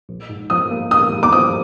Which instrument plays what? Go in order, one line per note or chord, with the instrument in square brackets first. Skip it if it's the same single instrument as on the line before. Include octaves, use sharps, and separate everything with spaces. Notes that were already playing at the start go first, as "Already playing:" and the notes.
[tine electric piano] A#1
G#2
[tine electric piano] F3 [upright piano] D#6
[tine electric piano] A#3
[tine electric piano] A#1 [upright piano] D#6
[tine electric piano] G#2
[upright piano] D6
[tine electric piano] F3 [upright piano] D#6